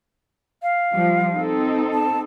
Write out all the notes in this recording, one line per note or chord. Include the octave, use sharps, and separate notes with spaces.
F5
F3 G3
C4 D#4 A4
A5